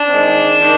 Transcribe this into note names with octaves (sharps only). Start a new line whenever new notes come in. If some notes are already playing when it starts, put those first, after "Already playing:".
Already playing: D4
D#3 G#3 C4
D#3 G#3